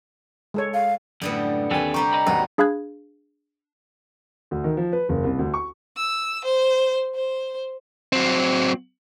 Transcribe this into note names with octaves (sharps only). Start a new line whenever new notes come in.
G#3 A4 C#5
F5
F#2 A2 D3 G3 B3
D#2 C4 A4 B4 G#5
C3 G3 G4 A#5 C#6
D#5 B5
G#1 D#2 F#4 B4
D4 G#4 F5 B5 F#6 G#6
D2
D#3
F3
B4
F#1
C2
D2
C#6
E6
C5
C5
F#3 C4